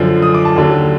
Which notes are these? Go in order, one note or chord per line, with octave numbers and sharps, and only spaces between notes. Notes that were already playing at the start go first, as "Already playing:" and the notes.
Already playing: F#2 D3 F3
D#6
D6
A5
D#2 D3 F#3